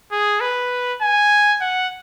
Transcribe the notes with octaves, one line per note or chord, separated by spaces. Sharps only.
G#4
B4
G#5
F#5